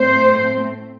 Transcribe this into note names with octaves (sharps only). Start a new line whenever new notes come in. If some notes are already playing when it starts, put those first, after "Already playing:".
Already playing: A2 A3 C4 C5